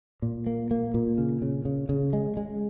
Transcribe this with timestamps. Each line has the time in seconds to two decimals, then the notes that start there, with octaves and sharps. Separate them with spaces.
0.22 A#2
0.47 A#3
0.71 A#3
0.94 A#2
1.18 C#3
1.42 C#3
1.65 C#3
1.89 C#3
2.13 G#3
2.37 G#3